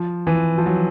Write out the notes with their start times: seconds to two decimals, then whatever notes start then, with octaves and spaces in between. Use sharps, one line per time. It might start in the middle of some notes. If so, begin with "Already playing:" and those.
Already playing: F3
0.27 E3
0.58 F3
0.66 F#3